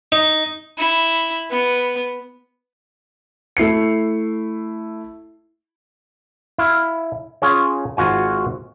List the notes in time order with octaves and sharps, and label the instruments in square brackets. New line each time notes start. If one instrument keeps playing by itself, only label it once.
[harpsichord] D#4
[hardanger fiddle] E4
B3
[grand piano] A3 E4 C7 C#7
[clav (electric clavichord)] E4 F5
C#4 F4 G#4 C#5
G#1 F4 F#4 G#5